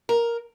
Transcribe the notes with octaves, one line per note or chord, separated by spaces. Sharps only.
A#4